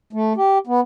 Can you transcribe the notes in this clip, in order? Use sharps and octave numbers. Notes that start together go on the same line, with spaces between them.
A3
G4
B3